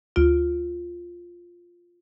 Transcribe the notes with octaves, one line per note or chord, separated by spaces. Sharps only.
D2 F4 D7